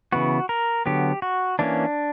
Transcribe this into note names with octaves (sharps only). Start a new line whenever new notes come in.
C#3 E3 B3 F#4
A#4
D3 F#3 B3 G4
F#4
E3 A#3 C#4 D4